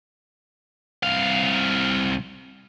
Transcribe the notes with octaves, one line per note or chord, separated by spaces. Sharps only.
C2 F5